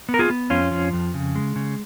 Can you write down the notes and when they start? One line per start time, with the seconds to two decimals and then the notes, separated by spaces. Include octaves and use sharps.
0.09 B3
0.14 A#4
0.19 F4 G#4
0.30 B3
0.50 F2 C#4 F4
0.72 F3
0.93 F2
1.14 C#3
1.35 G#3
1.56 C#3